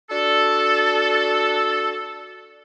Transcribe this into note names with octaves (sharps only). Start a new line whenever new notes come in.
D4 F#4 A4